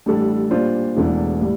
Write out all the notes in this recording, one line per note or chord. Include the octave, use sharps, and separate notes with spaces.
A1 A2 G3 D4 A4
A#2 G3 D4 F4 C5
E1 E2 E3 A3 D4
A2 G3